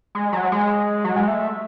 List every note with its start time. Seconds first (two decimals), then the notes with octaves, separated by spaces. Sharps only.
0.15 G#3
0.33 F#3
0.52 G#3
1.05 F#3
1.16 G#3
1.28 A3